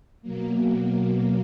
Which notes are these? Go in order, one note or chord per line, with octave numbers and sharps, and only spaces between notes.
B2 F#3 A#3